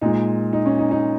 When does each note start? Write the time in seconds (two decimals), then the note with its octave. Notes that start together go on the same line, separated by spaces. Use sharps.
0.01 A#2 G#3 D#4
0.53 D#4
0.66 C#4
0.79 D#4
0.91 D#4